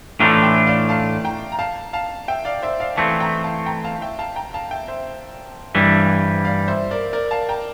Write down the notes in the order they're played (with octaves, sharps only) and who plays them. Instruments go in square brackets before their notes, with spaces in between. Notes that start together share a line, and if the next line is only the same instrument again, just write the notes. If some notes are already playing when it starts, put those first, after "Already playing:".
[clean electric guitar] A2 E3 A3 D4 F4 [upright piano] G5 A#5
[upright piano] E5 G5
D5 F5
F5 A5
G5 A#5
A#5
F5 A5
F5 A5
E5 G5
D5 F5
C5 E5
D5 F5
[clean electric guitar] E3 A3 C4 [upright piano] F5 A5
[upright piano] G5 A#5
F5 A5
G5 A#5
F5 A5
E5 G5
F5 A5
G5 A#5
F5 A5
E5 G5
C5 E5
[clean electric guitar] G2 E3 G3
[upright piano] D5 F5
C5 E5
A#4 D5
A#4 D5
F5 A5
G5 A#5